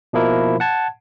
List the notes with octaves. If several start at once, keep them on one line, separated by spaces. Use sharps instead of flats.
B2 F3 A#3 E4 A#4
F#5 A5 G#6